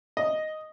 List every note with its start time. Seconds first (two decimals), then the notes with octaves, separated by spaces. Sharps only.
0.17 D#5